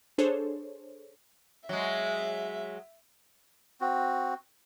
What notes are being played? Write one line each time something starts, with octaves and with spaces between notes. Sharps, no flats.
D4 G#4 A4 C5 C#5
F#3 G#3 E5
C4 F#4